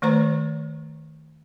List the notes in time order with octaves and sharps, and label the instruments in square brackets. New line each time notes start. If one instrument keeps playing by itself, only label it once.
[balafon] D#3 A3 B4 C5 A#5